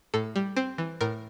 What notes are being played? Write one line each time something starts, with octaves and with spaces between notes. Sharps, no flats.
A2 A4
G3
C4
E3
A2 A#4